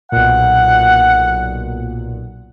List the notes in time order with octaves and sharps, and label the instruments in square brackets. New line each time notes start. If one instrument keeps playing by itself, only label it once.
[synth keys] B1 A#2 [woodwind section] F#5